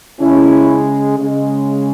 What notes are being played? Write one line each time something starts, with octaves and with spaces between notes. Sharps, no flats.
C#3 G#3 C#4 E4
C#3 G#3